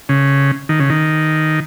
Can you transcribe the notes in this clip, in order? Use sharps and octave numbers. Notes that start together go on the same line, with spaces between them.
C#3
D#3
C#3
D#3